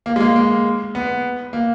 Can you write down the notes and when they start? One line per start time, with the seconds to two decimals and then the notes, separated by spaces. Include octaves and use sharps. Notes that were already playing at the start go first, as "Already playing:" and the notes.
0.06 A#3
0.16 G#3
0.20 A#3
0.36 A#3
0.95 B3
1.53 A#3